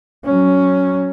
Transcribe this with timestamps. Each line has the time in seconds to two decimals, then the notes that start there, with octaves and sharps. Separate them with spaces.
0.25 F#3 C#4